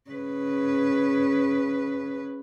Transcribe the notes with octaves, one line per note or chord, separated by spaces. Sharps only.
C#3 B4